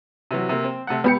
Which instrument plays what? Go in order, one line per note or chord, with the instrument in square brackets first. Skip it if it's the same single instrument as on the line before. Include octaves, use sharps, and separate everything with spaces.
[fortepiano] C3 E3 F#3
C3 A#3
C4
C3 A3 F#5
[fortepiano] C#2 [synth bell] B3 G4 C#7